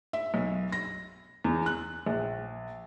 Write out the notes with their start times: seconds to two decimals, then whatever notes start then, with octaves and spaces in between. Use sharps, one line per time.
0.13 E5
0.34 B1
0.72 A#6
1.44 E2
1.66 F#6
2.06 A#1